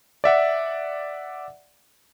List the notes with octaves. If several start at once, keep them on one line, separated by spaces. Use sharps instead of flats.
D5 E5 F#5